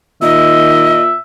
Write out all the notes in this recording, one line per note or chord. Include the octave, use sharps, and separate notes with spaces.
A#2 D#3 D#5 E5